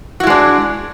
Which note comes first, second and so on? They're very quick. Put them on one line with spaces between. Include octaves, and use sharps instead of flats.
F#4 E4 G#3 D4